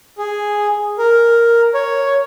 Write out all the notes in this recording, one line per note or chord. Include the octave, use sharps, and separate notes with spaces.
G#4
A#4
C#5